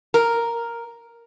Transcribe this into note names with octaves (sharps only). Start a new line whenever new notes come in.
A#4